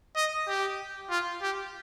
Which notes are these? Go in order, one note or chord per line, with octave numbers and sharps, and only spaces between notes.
D#5
G4
F4
G4